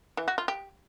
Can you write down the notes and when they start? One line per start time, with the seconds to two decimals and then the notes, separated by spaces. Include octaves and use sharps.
0.17 E3
0.28 F#4
0.38 F4
0.48 G4